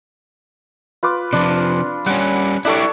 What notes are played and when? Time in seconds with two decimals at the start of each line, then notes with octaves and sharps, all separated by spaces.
1.03 F4 B4 D6
1.33 C3 F3 D4
2.06 G3 C#4 F#5
2.65 D4 E4 G4 A4 C#5